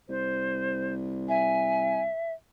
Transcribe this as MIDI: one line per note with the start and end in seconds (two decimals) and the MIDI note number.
0.09 2.08 36
0.09 0.94 72
1.29 2.33 76
1.29 2.02 80